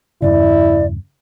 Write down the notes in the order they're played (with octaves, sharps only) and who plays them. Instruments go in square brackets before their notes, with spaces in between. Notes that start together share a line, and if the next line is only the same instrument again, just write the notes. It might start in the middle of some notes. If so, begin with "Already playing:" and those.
[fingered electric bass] E2 G2 C#3 [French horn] E4 [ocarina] D5